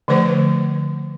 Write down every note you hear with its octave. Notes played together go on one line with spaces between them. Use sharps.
D3 F3 A3 B4 C5